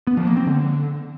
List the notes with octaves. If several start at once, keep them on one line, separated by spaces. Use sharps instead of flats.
B3
F3
A#3
C4
D3